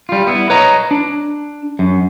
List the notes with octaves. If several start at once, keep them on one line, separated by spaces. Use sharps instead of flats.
G3 F4
B3 E4
B4 C#5 D#5 A#5
D4
F#2